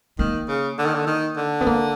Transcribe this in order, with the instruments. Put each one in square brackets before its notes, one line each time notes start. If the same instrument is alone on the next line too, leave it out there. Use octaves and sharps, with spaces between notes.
[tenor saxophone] D#3 [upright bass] A#3
[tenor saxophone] C#3
D3
D#3
D3
D#3
D3
[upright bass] B3
A#3